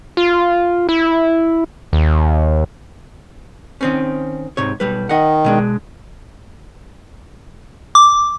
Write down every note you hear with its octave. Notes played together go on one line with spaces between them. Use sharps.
F4
E4
D#2
D#3 C4 C#4
G#2 C3 C#5
B1 G3 B4
D#3 D#5 F#5
B2 G#3 D4
D6